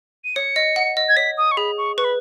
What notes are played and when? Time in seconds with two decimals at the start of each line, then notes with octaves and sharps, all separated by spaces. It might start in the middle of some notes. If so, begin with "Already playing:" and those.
0.24 D#7
0.36 C#5 C#7
0.56 D#5
0.76 F#5
0.97 D#5
1.09 G#6
1.16 C#5 B6
1.38 D#6
1.52 C#6
1.57 G#4 B5
1.78 C#6
1.97 B4 C#6
2.04 B5